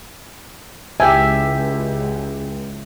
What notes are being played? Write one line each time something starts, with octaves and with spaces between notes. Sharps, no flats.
C#2 G4 E5 G5 G#5